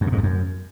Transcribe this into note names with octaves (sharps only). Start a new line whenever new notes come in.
F#2
A#2
G#2
E2
F#2